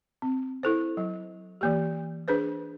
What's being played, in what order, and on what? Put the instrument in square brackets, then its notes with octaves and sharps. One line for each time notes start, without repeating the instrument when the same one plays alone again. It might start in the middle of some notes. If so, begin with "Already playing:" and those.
[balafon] C4
E4 A4 C5
F#3
E3 A#3 G4
D4 G#4 B4 C5